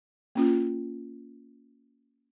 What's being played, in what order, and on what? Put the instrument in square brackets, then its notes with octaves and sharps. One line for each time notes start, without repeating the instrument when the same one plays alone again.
[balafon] A#3 C#4 F4